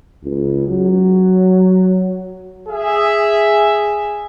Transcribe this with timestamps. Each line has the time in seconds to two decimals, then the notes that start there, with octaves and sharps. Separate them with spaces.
0.24 C#2
0.68 F#3
2.69 G#4 E5